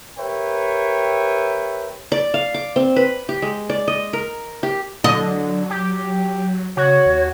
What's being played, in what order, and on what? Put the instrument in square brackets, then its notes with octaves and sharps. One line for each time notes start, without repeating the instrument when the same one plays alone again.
[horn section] G4 A#4 B4 C#5 E5 G5
[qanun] D5
F5
D6
C4
B4
G4
G#3
D5
D#5
A#4
G4
[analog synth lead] D3 [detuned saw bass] F#3 [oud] D#5
[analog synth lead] G4
[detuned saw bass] C#3 [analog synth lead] F#4 [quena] C#5
[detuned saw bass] D#2